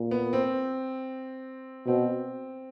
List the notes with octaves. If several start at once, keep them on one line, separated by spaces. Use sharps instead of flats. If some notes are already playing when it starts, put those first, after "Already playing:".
Already playing: A#2
B3
C4
B2 C4